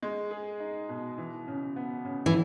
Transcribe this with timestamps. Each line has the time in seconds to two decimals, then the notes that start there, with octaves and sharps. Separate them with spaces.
0.03 G#3
0.31 G#4
0.60 D#4
0.89 B2
1.18 E3
1.47 C#3
1.76 B3
2.05 C#3
2.26 E3